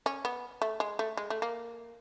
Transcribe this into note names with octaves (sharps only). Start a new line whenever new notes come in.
C#4
B3
A3
G#3
A3
G#3
A3
A#3